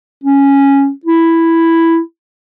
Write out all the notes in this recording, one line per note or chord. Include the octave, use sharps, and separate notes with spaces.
C#4
E4